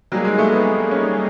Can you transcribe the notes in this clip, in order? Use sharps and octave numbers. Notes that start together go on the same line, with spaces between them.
F#3 G3 A#3 D#4 G#4
G#3
A3
B3
C#4